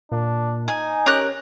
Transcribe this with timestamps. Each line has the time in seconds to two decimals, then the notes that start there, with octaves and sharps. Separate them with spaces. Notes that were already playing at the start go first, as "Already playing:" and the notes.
0.12 A#2 D4
0.68 D#4 G#5
1.06 C#4 G4 A#4 F#6